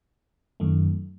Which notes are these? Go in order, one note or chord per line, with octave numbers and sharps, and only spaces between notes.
F#2 D#3 A3